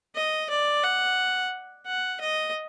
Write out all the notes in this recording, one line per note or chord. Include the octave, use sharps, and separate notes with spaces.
D#5
D5
F#5
F#5
D#5